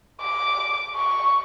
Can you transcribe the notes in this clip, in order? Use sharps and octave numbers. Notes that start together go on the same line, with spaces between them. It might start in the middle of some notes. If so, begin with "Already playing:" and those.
D6
C#6